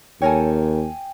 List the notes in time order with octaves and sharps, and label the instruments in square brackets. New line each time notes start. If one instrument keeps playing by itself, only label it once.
[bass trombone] D#2 [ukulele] A4 A#4 C#5 [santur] G5 G#5